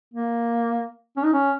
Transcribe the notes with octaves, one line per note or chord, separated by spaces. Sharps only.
A#3
C#4
D#4
C#4